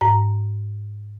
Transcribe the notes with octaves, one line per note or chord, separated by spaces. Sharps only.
G#2 A#5